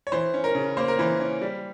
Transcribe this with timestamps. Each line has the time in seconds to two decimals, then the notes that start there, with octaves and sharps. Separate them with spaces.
0.07 C#5
0.12 E3 C5
0.34 C#4
0.44 A#4
0.55 C#3
0.77 A#3 C5
0.88 A#4
0.99 E3 C5
1.20 C#4
1.41 G3